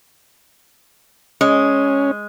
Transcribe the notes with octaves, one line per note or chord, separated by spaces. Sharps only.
G#3 C#4